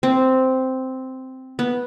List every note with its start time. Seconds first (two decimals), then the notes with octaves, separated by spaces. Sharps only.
0.03 C4
1.59 B3